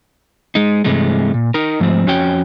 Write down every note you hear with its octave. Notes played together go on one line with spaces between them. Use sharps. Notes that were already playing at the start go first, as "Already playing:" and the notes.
G#3 D#4
G2 C3 E3 G#3 A3
A#2
D#4 A#4
G#2 F3 A3 C4
F2 C#4 F#4 C#5 G5